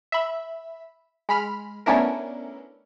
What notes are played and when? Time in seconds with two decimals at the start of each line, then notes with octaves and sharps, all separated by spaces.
0.12 E5 B5
1.29 G#3 B5 F6
1.86 A3 B3 C#4 D4 E4 A#4